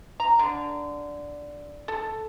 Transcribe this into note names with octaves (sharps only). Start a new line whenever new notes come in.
A#5
D3
A4